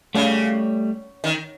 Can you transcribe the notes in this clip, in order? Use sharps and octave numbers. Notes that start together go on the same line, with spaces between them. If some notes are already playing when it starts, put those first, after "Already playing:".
C#3 G3 A3
D#3